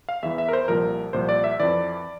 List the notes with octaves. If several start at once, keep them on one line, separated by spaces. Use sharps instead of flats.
F5
E2 E3 E5
E5
A#4
C5
C2 A#2 F3 A#4
C2 A#2 F3 C5
D5
E5
F2 E3 D5